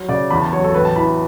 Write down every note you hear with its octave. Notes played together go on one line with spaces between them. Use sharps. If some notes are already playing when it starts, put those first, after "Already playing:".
Already playing: F#3
C#3 D5
E2 B5
A5
F#3 C#5
A4
A1 B4
A5
E3 B5